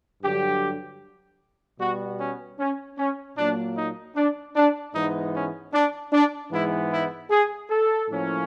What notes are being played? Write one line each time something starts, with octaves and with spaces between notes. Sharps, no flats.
G2 D3 F#3 G4
B2 G3 B3 F#4
C#4
C#4
C#4
A#2 F#3 A#3 D4
D#4
D4
D4
G#2 E3 G#3 B3 D#4
C#4
D4
D4
G#2 E3 G#3 B3 E4
E4
G#4
A4
A2 F3 A#3 C#4